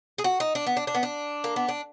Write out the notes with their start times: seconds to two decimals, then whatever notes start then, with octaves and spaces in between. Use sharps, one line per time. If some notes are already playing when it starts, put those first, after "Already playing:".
0.18 G#4
0.24 F#4
0.40 D#4
0.55 D4
0.66 B3
0.77 D4
0.87 D4
0.95 B3
1.03 D4
1.44 A#3
1.56 B3
1.69 D4